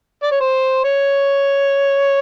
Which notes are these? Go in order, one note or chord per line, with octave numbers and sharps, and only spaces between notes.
D5
C#5
C5
C#5